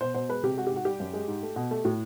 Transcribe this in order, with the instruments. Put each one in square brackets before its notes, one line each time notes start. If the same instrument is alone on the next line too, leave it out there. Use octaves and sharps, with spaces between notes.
[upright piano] B2 C5
B2 C5
G#3 B4
C3 G4
G#3 F#4
G4
G#2
F#4
G3 G4
F#2
G#3
G#2
A3
B2
A3
A2